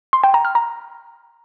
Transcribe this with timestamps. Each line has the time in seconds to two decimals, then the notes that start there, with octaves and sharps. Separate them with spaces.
0.13 C6
0.24 G5
0.34 A#5
0.45 F6
0.55 A#5